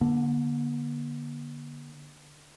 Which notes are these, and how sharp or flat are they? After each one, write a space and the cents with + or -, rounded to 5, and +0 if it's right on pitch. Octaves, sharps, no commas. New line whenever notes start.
D3 +0 A#3 +45